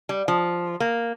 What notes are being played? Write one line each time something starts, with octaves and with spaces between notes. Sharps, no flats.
G3
F3
A#3